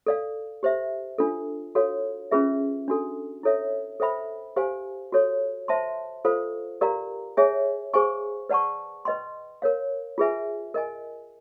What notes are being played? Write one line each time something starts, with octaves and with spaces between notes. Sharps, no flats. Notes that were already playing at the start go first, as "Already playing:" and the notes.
A4 D5 F5
G4 C5 E5
D4 F4 A4
F#4 A4 C#5 F5
C#4 F4 G#4 B4 E5
D4 F#4 A4
E4 A4 C#5 E5
A4 C5 E5 G5 B5
G4 C5 F5 G#5
F#4 A4 C#5
C5 E5 A5 C6
F4 A4 C5 F5
G4 A#4 D5 F5 A#5
G#4 C#5 E5 G#5
G#4 C5 F5 G#5 C#6
B4 D5 F#5 A5 C#6
B4 D#5 G5 C6
A#4 C#5 F5
F4 G#4 B4 E5 G#5
A#4 D#5 G#5